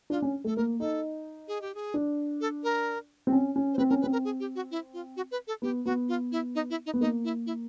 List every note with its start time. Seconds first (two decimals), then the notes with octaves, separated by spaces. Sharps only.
0.10 D4 F4
0.22 C#4
0.44 A3 A4
0.56 A#3 A#4
0.80 D#4 A4
1.48 G#4
1.61 G4
1.75 G#4
1.94 D4
2.41 A4
2.63 A#4
3.27 C4
3.32 C#4
3.56 C#4
3.73 C5
3.78 C4 B4
3.89 C#4 A#4
4.01 B4
4.04 C4
4.12 A#4
4.24 G#4
4.40 G4
4.55 F#4
4.71 E4
4.93 F4
5.16 F#4
5.31 B4
5.47 A4
5.62 B3 G4
5.85 B3 F#4
6.08 F4
6.32 E4
6.55 D#4
6.70 E4
6.86 D#4
6.94 B3
7.00 A#3 D#4
7.24 E4
7.46 E4